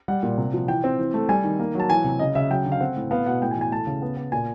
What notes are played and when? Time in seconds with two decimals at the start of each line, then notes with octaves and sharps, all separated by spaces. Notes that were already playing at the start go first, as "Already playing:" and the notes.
0.08 G3 F#5
0.23 A#2
0.38 C3
0.54 F3
0.68 E3 G5
0.84 C4
0.99 E3
1.14 A3
1.29 G3 G#5
1.44 D#3
1.60 A#3
1.75 F#3 A5
1.90 E3 G#5
2.04 C3
2.19 C#3 D#5
2.35 C#3 E5
2.50 F#3 G5
2.65 D3
2.72 F5
2.81 C4 F#5
2.96 A2
3.11 B3 F5
3.26 B2 F#5
3.42 A2 G5
3.51 G#5
3.56 E3
3.61 G#5
3.71 A3 A5
3.87 C#3
4.02 B3
4.17 B3
4.32 A#2 G#5